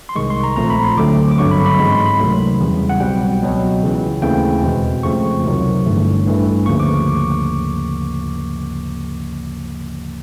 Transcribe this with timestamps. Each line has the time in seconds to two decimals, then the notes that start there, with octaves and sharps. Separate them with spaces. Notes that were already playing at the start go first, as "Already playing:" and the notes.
0.09 C6
0.16 C2 C3 D#3 G#3 C#6
0.30 C6
0.43 A#5
0.56 A#1 A#2 F3 A3 C4 A#5
0.70 B5
0.84 C6
0.97 D2 D3 F#3 A3 C4 D6
1.31 D6
1.38 G#1 G2 D3 F#3 B3 C#6
1.51 B5
1.66 B5
1.79 G#2 E3 G#3 C4 B5
1.92 C6
2.06 B5
2.20 C#2 C3 D#3 F#3 A3
2.61 E2 C#3 E3 G3
2.89 F#5
3.00 B1 B2 G3 C4 G5
3.41 C#2 B2 F#3
3.82 C#2 C#3 E3
4.22 D#2 C#3 E3 A3 C4 G5
4.63 E2 B2 G#3 C4
5.03 F2 C#3 F3 A3 C4 C#6
5.45 C#2 C3 D#3 F#3
5.86 G1 G2 E3 A3
6.26 A1 G2 E3 A3
6.66 D2 C#3 F3 A#3 C#6
6.80 D6